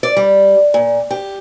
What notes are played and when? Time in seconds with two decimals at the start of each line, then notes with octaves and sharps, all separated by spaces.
0.03 D5
0.17 G3
0.74 A#2
1.11 G4